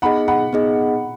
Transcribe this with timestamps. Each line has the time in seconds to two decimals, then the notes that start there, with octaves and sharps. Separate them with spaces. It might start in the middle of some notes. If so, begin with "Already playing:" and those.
0.02 B3 D#4 G#4 D#5 F#5 B5
0.28 F#5 B5
0.53 B3 D#4 G#4 D#5